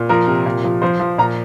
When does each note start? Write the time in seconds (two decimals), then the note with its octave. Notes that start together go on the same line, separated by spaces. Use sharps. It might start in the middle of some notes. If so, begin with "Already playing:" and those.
Already playing: A#2
0.09 F3 A#4
0.27 C3
0.46 A#2
0.64 F3
0.82 F3 C5
1.00 F3
1.18 A#2 A#5